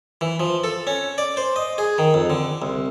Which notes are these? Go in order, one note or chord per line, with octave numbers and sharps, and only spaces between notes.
E3
F3
A4
C#4
D5
C5
D#5
G#4
D#3
F2
D3
C2